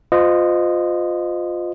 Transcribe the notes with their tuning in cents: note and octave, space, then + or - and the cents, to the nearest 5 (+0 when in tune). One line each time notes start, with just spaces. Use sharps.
F4 +15 C5 -30 D#5 -15